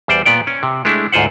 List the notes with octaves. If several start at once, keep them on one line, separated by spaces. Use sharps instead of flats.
E2 G3 C5 D5
A#2 B3 D5 G5
C#4
C3
G#3 A3 D4 E4
D2 G#2 F4 C5 F#5